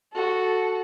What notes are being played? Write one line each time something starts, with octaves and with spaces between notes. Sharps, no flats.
F#4 A4